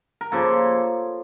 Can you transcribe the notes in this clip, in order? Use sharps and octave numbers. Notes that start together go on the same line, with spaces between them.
A#4
C#3 F3 A#3 A4